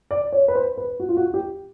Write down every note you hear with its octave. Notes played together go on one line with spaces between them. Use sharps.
D5
C#5
B4
C5
B4
F#4
F4
F#4
G4